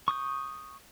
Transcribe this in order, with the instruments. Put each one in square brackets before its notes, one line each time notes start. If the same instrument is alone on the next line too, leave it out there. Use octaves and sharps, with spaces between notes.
[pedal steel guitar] C#6 D#6 G6